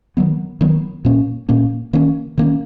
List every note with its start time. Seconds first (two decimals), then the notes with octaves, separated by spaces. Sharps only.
0.17 D#3 F#3 B3
0.61 D#3 F#3 B3
1.05 A#2 A#3 C#4
1.49 A#2 A#3 C#4
1.93 D#3 A#3 C#4
2.38 D#3 A#3 C#4